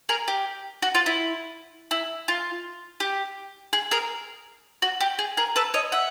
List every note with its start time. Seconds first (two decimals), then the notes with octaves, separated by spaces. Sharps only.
0.09 G#4 A#4
0.28 G4
0.82 F#4
0.95 F4
1.06 E4
1.91 E4
2.28 F4
3.00 G4
3.73 G#4
3.91 G#4 A#4
4.82 F#4
5.00 G4
5.19 G#4
5.37 G#4 A#4
5.56 A4 B4
5.74 C#5 D#5
5.92 E5 F#5